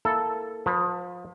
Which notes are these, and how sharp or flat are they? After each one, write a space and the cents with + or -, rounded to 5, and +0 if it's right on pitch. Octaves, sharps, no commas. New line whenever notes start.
A#3 +0 E4 +0 A4 +0
F3 +30 B4 -10